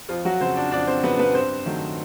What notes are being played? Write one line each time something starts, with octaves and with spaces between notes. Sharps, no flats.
F2 F3 F4
F#3 F#4
C#3 F#3 C4 C5
D4 D5
F2 D4 D5
C4 C5
C#3 F#3 B3 B4
B3 B4
G2 C4 C5
D#3 F#3 A3